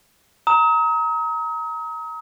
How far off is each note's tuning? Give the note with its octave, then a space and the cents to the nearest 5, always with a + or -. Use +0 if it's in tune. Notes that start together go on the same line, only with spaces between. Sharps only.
A#5 +0 D#6 +40